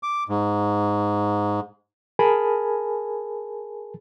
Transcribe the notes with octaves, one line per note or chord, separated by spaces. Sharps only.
D6
G#2
G#4 A#4 G#5 A5 B5